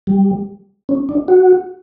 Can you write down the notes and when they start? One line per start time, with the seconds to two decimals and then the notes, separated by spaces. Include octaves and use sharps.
0.07 G3
0.89 C#4
1.09 D4
1.28 F#4